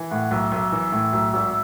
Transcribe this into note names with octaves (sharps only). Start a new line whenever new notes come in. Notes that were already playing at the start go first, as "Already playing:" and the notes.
Already playing: E3
A2 F#5
B1 E5
B1 E5
E3
A2
B1
G#1